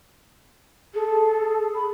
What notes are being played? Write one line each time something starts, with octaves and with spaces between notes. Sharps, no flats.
G#4 A4
B5